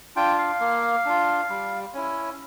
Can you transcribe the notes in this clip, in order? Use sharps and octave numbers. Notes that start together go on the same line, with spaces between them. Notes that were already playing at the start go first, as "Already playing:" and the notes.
D4 F4 G5
F5
A#3
D4 F4
G3
C#4 E4